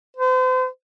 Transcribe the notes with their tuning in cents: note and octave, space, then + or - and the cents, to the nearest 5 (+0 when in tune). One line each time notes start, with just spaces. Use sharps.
C5 -40